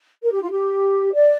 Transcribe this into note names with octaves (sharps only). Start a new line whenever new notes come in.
A#4
G4
F4
G4
D5